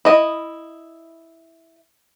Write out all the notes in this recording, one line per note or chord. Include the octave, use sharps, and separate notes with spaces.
E4 D#5